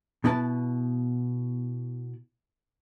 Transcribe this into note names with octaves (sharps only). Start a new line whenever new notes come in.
B2 B3 E4 B4 A5